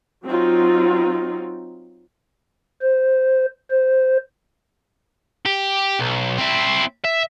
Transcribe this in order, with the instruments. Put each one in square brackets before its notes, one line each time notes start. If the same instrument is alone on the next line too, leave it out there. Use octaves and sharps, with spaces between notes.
[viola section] F#3 C4 D#4 F4
[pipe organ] C5
C5
[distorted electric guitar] G4
B1
C4 E4
E5